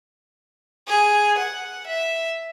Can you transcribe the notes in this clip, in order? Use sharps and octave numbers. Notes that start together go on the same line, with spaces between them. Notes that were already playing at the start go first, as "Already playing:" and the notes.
G#4
F#5
E5